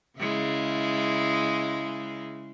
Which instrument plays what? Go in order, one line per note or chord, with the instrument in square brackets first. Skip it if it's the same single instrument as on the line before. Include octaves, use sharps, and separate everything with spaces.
[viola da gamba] C#3 G#3 E4